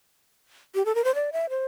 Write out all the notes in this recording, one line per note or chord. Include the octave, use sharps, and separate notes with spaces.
G4
A4
A#4
C5
D5
E5
C5